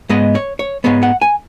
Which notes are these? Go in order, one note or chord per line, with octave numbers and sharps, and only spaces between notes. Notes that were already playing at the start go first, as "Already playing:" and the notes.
G#2 G#3 B3 D#5
C#5
C#5
G#2 G#3 B3 C#5
F#5
G#5